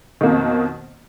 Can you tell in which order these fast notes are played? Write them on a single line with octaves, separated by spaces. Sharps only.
D#3 A#3 B2 F2